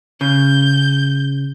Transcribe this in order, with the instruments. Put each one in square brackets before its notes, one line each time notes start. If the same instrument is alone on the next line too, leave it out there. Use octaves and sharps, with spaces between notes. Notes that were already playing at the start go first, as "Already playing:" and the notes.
[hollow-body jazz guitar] C#3 [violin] G6